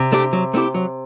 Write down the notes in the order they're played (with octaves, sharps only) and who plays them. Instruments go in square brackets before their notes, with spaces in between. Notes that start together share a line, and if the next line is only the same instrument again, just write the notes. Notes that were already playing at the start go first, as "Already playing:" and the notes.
Already playing: [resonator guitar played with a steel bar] C3
[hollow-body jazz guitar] A3 D4 G4
F#3
A3 C4 E4 G4
F#3